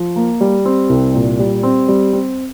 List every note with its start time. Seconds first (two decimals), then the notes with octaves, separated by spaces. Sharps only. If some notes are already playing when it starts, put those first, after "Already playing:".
Already playing: F3
0.16 A#3
0.41 G3
0.65 C4
0.89 C2
1.14 A#2
1.39 G3
1.63 C4
1.88 G3
2.13 C4